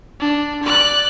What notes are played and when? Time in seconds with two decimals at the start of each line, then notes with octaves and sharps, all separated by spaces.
0.20 D4
0.63 D5 F#6